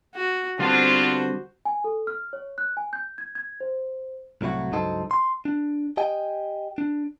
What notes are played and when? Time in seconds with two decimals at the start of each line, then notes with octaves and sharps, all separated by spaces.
0.15 F#4
0.59 D3 G3 B3 C4 D4 F4 F#4 C5
1.65 G#5
1.84 A4
2.07 F6
2.33 C#5
2.58 F#6
2.77 G#5
2.93 G6
3.18 G#6
3.35 G#6
3.60 C5
4.41 C2 A2 F#3 E4 F#4
4.72 C#2 G2 F#3 D#4 A4 C5
5.11 C6
5.45 D4
5.97 G4 D#5 G5 G#5
6.78 D4